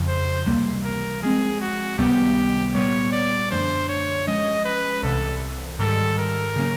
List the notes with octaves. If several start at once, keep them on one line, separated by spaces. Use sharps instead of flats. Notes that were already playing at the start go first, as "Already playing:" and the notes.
Already playing: F2 C#3 F3
C5
C#2 C3 E3 G3 A#3
A#4
F3 G#3 C4 G#4
F#4
C#2 C3 D#3 G3 B3 G4
A#2 G3 B3 C#5
D5
F#2 D3 F3 A3 D4 C5
C#5
F3 G#3 C#4 D#5
B4
C2 C3 E3 A4
G#2 D#3 G3 A4
A#4
C#3 F#3 A#3 C#4